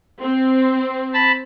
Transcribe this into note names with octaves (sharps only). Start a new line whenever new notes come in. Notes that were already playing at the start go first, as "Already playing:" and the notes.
C4
A5 B5